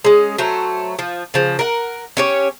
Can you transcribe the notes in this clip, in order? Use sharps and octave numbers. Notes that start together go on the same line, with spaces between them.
G#3 C#4
F#3 A3 C5 A#5
F3
C#3 F3
A#4 F#5
C#4 G4 C#5